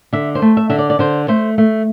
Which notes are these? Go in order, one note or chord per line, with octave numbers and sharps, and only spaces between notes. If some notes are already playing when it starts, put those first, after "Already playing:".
D3 E5
C5
A3
E5
D3 E5
D5
D5
D3 C5
A3 C5
A3